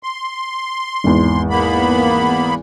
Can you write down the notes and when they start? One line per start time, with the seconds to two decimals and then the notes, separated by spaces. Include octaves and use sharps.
0.03 C6
1.04 G#1 E2
1.50 A#3 B3 B5